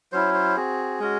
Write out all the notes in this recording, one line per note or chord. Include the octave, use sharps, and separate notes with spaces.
F#3 C#4 E4 C5
C5
C4 F#4 G#4
G#3 C#4 F#4